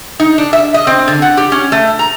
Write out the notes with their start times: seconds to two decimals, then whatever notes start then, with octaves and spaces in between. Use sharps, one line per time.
0.20 D#4
0.38 D4
0.53 E5
0.74 D#5
0.87 C4
1.08 D3
1.22 F#5
1.37 G4
1.52 C#4
1.72 A3
1.99 A#5